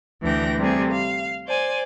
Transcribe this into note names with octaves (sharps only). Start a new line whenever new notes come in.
D2 E3 D4 G5 A#6
C3 G3 A3 C4 G#4
F5
C5 D5 G#5